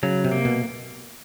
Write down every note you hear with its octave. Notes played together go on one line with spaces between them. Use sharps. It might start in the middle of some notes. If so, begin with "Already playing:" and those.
C#3 F#3
C3
A#3
B2